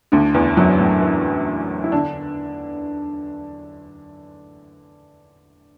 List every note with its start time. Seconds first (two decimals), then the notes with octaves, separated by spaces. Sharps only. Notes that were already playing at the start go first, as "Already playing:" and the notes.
0.12 D2 D3
0.34 E2 E3
0.57 F#2 F#3
0.79 A2 A3
1.02 E3 E4
1.84 E4
1.92 D3 D4